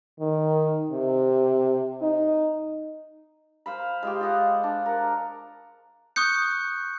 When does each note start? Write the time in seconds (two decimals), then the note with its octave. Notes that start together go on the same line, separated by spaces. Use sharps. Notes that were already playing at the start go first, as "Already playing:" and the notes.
0.20 D#3
0.91 C3
2.02 D#4
3.66 C5 F5 B5
4.03 G#3 F4 G4
4.21 F4 D#5 F#5
4.63 D4
4.86 A#4 F#5
6.16 C#6 D#6 F#6 G6 C#7